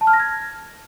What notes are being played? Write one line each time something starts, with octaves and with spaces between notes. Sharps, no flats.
A5
F6
A#6
G#6